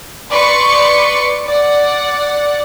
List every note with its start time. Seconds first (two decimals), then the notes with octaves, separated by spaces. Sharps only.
0.29 B4 D5 C6 C#6 C#7
1.47 D5 F#5